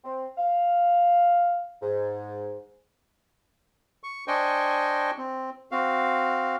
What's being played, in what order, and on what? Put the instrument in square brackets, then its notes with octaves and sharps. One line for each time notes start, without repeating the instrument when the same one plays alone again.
[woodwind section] C4
F5
G#2
[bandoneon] C#6
D4 C5 D#5 G5 G#5 C#6
C4
C4 F#4 F5